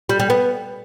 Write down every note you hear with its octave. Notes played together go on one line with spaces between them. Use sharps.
G3
G3
B3